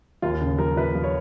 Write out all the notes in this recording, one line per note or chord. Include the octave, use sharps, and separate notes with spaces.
D#2 F4
C#3
F3 A#4
F3 B4
F3
C#5